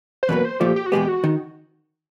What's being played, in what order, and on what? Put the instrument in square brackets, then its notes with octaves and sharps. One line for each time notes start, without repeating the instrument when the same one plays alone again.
[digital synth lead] C5
[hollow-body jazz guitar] E2 B2 F#3 A#3 [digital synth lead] B4
[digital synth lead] C5
[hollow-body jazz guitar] A#2 F3 A3 [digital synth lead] G4
[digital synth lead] G4
F#4
[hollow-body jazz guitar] E2 B2 G#3 B3 [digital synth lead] G4
[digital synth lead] F#4
[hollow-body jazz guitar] D#3